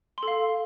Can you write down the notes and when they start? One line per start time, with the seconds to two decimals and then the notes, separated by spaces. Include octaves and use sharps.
0.18 C6
0.23 A4
0.28 F5